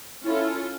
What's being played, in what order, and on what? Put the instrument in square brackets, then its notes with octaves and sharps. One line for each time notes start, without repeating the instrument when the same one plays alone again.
[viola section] C#4 F4 A4 [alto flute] E4